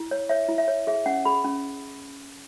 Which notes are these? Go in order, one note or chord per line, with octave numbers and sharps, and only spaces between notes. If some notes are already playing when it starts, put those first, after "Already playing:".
Already playing: E4
C#5
C#5 E5
E4
E5
C#5
G#4 E5
C#4 F#5
G#4 B5
C#4